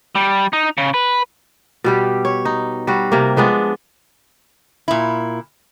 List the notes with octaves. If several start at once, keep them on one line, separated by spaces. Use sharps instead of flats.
G3
D#4
C#3
B4
B2 G3 G4
C#5
D#4
G3 F#4
C3 A#3
F3 G#3 B3 D4
A#2 E4